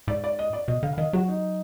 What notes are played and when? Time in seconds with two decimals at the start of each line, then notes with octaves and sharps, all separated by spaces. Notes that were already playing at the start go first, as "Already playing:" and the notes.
0.08 G#2 D5
0.24 D5
0.39 D#5
0.53 D5
0.68 B2 D#5
0.83 D3 F5
0.93 F5
0.98 D#3 D#5
1.13 F#3 F#4
1.28 D#4